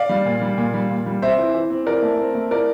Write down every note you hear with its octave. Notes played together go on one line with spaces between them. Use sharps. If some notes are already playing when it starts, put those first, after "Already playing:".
Already playing: D5 F5
G3
A#2
G3
A#2
G3
A#2
G3
C4 C5 E5
E3
E3
C4
E3 A#4 D5
A3
C4
A3
E3 A#4 D5